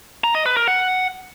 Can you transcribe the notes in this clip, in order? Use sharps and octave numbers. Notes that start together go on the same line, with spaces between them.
A#5
D#5
B4
A#4
F#5